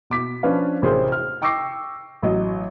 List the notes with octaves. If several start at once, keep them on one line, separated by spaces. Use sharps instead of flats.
B2 D6 B6
F3 C#4 D4 B4 F5
A1 C3 C4 G#4 A#4 C5
F6
G5 C#6 D6 E6 A#6 C7
A1 F#3 D#5